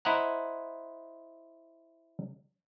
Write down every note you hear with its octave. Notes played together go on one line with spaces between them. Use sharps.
E4 C5 D#5 F#5 A#5